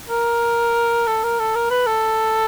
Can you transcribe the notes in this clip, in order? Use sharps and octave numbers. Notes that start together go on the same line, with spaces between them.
A#4
A4
A#4
A4
A#4
B4
A4